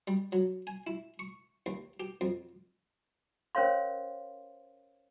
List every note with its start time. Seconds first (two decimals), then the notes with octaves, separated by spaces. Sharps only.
0.07 G3
0.32 F#3
0.67 G#5
0.87 E4
1.19 C#6
1.66 D#2
2.00 G4
2.21 F2
3.55 C#4 A#4 C5 C#5 F5 C6